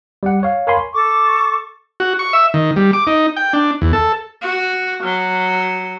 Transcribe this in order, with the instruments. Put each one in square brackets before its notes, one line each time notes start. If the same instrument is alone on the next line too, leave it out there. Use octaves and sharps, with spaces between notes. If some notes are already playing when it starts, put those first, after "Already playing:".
[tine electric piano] G3 F#5
C#5 F5
A#4 C#5 F5 G#5 B5 C6
[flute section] A4 C#6 D6
[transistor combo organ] F#4
C#6
E5
D#3
G3
D6
D#4
G5
D4
E2
A4
[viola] F#4
F#3